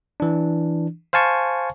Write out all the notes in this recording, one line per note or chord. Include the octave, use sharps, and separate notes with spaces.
E3 D4
C5 F5 G#5 A5 C#6